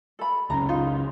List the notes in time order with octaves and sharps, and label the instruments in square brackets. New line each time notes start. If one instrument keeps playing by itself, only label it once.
[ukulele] A4 B5
[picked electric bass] C#2 F#2 C#3 [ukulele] A#5
[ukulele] D#4 F4